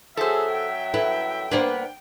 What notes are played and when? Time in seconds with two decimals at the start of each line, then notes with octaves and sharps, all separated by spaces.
0.17 F#2 F#3 G#4 A4 C5 E5
0.51 G5
0.94 E4 A4 B4
1.51 A#3 B3 D4 B4 C5